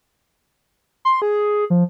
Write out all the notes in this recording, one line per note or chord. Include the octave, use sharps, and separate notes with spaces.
C6
G#4
F3